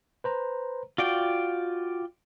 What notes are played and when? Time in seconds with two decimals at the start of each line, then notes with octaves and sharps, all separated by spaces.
0.24 B4 C5 A#5
0.98 F4 F#4 D5 G5